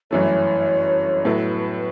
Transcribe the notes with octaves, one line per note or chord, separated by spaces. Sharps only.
G1 F#2 E3 A3 C#5
A2 F#3 B3 E4 A4 B4